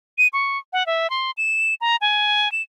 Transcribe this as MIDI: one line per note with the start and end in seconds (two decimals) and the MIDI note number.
0.18 0.28 99
0.33 0.58 85
0.73 0.86 78
0.86 1.10 76
1.10 1.31 84
1.37 1.74 100
1.81 1.96 82
2.01 2.51 80
2.52 2.62 100